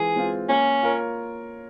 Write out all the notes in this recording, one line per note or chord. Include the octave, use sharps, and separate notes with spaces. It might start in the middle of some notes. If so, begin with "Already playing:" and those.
Already playing: E3 G#3 C4 F4 G#4
G#3 C4 F4
A#3 C#4
F4 A#4 C#5